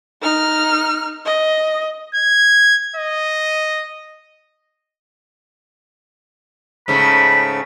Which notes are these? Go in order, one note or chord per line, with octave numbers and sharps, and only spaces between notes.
D#4 F6
D#5
G#6
D#5
G#2 C#3 A3 B5